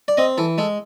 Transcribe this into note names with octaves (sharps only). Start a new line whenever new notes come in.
D5
C4 D#5
E3 A4
G#3 A4